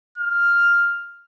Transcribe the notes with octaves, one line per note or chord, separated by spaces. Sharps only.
F6